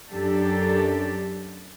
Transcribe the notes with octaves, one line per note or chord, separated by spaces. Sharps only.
F#2 D4 G4 A4